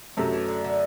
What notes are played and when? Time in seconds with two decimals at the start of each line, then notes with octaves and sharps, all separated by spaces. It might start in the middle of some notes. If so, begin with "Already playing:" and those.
0.17 F#2 C3 F#3 A3
0.33 E3
0.48 D3
0.64 D3